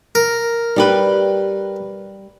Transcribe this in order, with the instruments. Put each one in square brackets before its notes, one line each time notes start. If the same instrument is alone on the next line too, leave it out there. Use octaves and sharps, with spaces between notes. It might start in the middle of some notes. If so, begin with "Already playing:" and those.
[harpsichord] A#4
[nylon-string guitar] G3 G4 B4